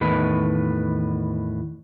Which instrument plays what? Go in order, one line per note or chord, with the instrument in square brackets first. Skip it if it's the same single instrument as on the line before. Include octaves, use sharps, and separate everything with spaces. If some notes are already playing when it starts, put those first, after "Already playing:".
[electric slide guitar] E2 A2 D#3 B4